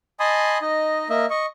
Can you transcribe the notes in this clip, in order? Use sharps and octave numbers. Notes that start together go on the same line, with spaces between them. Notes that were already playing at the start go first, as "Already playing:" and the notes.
D#5 G#5 A5 B5 C6 D#6
D#4 D#5
A#3 D#5 E5
D#5 C#6